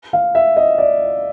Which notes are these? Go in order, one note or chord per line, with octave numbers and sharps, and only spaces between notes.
F5
E5
D#5
D5